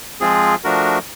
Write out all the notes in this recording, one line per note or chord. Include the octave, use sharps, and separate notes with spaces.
F3 G#3 C4 F4 G#4
F3 A3 D4 F#4 A#4